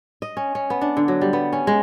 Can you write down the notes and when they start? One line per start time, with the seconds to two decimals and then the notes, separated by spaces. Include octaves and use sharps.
0.22 D#5
0.37 C#4
0.55 C#4
0.70 B3
0.81 D4
0.97 D3
1.08 F#3
1.21 G3
1.33 B3
1.53 C#4
1.67 G#3